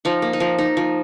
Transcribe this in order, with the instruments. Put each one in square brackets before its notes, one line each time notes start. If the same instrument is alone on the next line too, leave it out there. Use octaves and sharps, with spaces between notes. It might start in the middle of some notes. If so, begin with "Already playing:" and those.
[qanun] F3 D#4
A#3
D#4
F3
D#4
F3